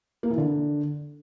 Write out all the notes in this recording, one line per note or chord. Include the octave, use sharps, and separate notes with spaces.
A#3
E3
D3